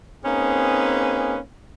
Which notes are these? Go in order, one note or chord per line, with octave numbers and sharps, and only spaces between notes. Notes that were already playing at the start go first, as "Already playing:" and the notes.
A#3 C4 C#4 D#4 G#4 B4